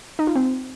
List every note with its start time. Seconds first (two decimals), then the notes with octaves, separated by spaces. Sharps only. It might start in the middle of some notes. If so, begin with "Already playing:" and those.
0.19 D#4
0.27 F4
0.36 C4